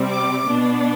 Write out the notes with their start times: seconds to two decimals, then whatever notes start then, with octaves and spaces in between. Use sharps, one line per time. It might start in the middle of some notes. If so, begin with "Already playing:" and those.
Already playing: C3 G3 C4
0.09 D6
0.47 B2 B3 D4